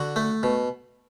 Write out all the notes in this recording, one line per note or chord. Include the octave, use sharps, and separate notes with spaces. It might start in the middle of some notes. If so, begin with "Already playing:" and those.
Already playing: D3 F#4
A3
B2